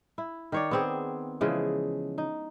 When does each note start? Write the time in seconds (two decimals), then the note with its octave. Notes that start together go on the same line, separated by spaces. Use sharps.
0.18 E4
0.52 D#3 C#5 D5
0.71 B3 C4 G#4
1.41 C#3 E3 F3 G#3
2.18 D#4